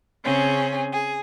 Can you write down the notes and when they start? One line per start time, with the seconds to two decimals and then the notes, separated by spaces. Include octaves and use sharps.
0.24 C#3 C4 C#4 G#4
0.92 G#4